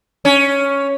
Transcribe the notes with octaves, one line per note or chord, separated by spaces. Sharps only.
C#4